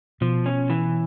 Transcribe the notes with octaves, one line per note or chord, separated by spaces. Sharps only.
B2 F3
C#4
E3